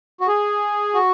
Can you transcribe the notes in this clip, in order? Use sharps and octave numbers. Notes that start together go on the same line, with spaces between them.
F#4
G#4
F#4